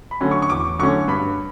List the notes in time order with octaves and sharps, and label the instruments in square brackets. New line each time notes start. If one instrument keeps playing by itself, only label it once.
[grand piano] B5
D3 F#3 A3 C#4
C#6
C#6
E2 D6
D3 F#3 A3 C#4 C#6
G2 B5